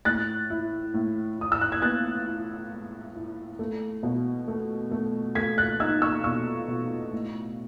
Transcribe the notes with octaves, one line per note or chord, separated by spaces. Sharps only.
A2 F#6 A6
E4
A2
E4 D#6
E6
F#6
G#6
B3 F#6 A6
E4
G#3
E4
A3
B2
A3
A3
A3 G#6 B6
F#6 A6
D#4 E6 G#6
C#6 E6
B2 C#6 E6
B2
A2